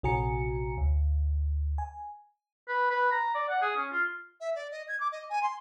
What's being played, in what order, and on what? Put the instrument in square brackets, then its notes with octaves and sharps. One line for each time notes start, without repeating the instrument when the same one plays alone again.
[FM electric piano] A#1 C3 F#4 G#5 A#5 C#7
D2
G#5
[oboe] B4
B4
A#5
D5
F#5
G#4
C#4
F4
[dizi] E5
D5
D#5
G#6
D6
D#5
G#5
C6